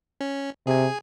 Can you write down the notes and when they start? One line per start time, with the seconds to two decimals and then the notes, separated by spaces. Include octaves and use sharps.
0.21 C#4
0.67 C3 G#4 G#5